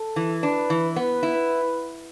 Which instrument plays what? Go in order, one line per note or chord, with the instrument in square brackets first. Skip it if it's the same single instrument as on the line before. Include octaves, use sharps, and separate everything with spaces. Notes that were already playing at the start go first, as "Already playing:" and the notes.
Already playing: [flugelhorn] A4
[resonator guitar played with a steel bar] E3
[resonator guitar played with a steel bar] D4 [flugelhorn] B4
[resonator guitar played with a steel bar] E3
[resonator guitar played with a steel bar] B3 [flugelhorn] B4
[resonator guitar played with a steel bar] E4